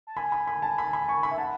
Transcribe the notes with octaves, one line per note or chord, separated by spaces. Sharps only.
A5
G#5 B5
B5
B5
A5
B5
B5
C#6
B5
E5
F#5 A5